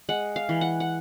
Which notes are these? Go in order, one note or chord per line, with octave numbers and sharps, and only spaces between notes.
G#3 F#5
F5
E3
F#5
F#5